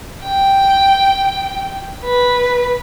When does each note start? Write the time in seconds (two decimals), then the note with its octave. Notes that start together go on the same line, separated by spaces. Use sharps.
0.24 G5
2.04 B4